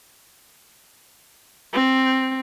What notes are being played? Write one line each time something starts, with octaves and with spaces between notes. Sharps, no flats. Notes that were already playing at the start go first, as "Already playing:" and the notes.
C4